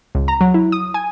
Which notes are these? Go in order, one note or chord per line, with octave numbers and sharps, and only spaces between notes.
C#2
A#5
F#3
E4
D#6
G#5